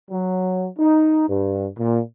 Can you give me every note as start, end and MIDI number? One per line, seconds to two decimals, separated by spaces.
0.11 0.67 54
0.79 1.27 63
1.28 1.67 43
1.78 2.00 46